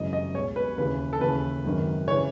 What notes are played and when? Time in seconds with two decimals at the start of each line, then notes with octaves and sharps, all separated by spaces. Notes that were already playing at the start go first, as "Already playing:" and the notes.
Already playing: G#1 F#2 C#3 E3 D#5
0.13 D#5
0.34 C#2 B2 C#5
0.56 B4
0.78 D#2 C#3 E3 B4
1.13 A4
1.21 D#2 C#3 E3 B4
1.65 G#1 F#2 D#3
2.08 C#3 E3 C#5